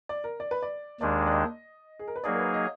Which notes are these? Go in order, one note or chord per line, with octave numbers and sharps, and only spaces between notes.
D5
A#4
D5
B4
D5
D#2 D#3 G#3 D4 D5
D5
D#5
G#4
A#4
B4
F#3 A#3 D#4 G#4 D5
A#4
B4
D#5